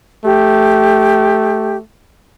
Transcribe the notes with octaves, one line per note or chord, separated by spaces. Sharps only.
A3 G4